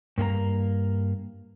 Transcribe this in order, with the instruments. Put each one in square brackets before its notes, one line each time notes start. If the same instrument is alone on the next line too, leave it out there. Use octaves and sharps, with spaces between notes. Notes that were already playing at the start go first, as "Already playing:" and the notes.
[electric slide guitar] G2 A#3 G#4 A#5